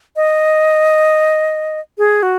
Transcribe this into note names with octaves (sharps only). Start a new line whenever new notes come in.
D#5
G#4
F#4